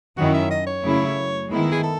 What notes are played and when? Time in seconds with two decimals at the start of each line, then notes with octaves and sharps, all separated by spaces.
0.17 F#2 D#3 F#3 C#4 E4 F#4
0.34 E5
0.51 D#5
0.67 C#5
0.83 F#2 C#3 F#3 A3 E4
1.50 D#3 G#3 B3 E4
1.71 G#4
1.83 A4